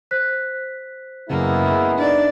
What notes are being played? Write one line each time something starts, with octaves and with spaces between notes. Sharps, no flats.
C5 F#6 B6
F#2 C#3 G#3 A#3 B3 E4
D4 D#4 D5